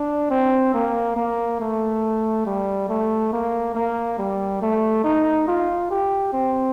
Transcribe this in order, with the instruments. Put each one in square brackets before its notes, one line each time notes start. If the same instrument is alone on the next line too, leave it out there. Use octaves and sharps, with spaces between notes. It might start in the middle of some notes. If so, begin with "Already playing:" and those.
Already playing: [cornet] D4
C4
A#3
A#3
A3
G3
A3
A#3
A#3
G3
A3
D#4
F4
G4
C4